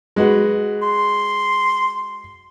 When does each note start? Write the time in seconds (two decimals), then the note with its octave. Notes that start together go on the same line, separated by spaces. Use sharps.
0.16 G#3 F#4 B4
0.82 C6